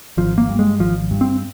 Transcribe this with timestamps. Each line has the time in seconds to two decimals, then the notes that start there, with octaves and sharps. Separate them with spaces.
0.17 G#1 F3
0.38 A#3
0.49 G2
0.59 G#3
0.79 G#1 F3
1.11 G2
1.21 C4